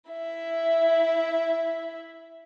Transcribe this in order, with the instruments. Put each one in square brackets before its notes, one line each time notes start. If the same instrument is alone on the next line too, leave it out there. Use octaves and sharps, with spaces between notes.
[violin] E4 E5